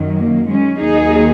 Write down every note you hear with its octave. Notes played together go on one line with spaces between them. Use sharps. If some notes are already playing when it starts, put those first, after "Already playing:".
Already playing: F#2 D#3 F#3
A#3
G#3 C#4
D#2 D#3 F#3 D#4 G#4